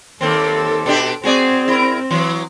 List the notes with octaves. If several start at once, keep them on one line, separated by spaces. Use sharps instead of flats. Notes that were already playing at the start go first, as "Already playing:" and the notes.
D#2 A#3 C4 A4
B2 D4 G4
C4 F#4 G#4 D5
E4 A#4
E3 F#3